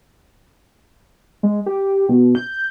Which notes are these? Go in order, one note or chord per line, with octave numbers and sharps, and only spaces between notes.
G#3
G4
B2
G6